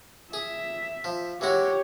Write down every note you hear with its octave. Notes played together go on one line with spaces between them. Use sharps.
G#4 E5
F3
E3 G#3 F#4 G4 C#5